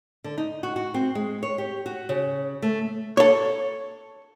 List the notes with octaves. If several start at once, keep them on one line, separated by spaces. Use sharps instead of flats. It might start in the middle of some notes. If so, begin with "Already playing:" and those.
D3
D#4
F#4
F#4
C4
G#3
C#5
G4
F#4
C#3
A3
A4 C#5